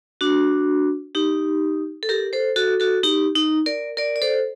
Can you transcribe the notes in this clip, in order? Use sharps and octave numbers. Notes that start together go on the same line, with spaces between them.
D4 F#4
D#4 G4
A4
G4 A#4
A4 C5
F#4 A4
F#4 A4
D#4 G4
D#4
A#4 D5
A#4 D5
D5
A4 C5